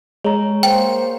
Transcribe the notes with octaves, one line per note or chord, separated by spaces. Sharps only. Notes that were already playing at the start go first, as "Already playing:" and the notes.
G#3 C#5 A#5
A#3 C5 G5